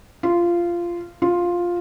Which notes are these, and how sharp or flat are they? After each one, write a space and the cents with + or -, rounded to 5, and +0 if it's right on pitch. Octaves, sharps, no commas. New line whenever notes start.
F4 -15
F4 +5